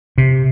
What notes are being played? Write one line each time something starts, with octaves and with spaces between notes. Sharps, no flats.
C3